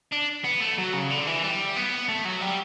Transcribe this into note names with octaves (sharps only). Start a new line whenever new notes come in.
D4
B3
A3
F#3
C#3
D3
E3
G3
B3
A3
F#3
G3